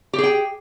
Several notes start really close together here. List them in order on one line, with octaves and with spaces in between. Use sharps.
G4 G#4 G5